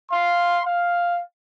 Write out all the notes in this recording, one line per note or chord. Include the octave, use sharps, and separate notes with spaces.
F5 C6
F5